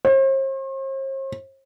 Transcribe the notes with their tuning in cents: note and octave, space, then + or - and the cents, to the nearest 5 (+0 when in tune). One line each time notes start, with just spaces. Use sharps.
C5 +45